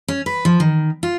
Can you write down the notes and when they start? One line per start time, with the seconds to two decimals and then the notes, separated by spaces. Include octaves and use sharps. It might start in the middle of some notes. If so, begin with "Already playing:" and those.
0.08 C#4
0.26 B4
0.45 F3
0.60 D#3
1.03 F4